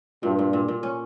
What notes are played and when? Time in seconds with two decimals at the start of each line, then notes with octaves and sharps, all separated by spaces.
0.23 G2 A#2
0.39 A#2
0.53 A#2
0.68 A#2
0.83 C#4